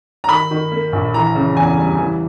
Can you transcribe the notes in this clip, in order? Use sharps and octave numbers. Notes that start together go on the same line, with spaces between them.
A#5
D#3 B5
D#3
A#3
A#1
E3 A#5
C#3
E2 G#5
G3
E3